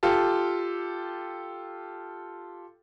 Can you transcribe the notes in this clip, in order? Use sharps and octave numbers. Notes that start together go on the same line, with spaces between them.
F4 G4 A4